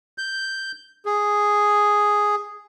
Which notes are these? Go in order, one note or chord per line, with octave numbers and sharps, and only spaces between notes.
G6
G#4